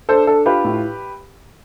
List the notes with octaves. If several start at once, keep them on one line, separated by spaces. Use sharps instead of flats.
D4 A4 C5
D4 A4
F4 G4 B4
A2